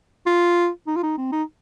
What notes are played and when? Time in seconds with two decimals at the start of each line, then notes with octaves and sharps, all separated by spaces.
0.26 F4
0.87 D#4
0.96 F4
1.03 D#4
1.18 C4
1.32 D#4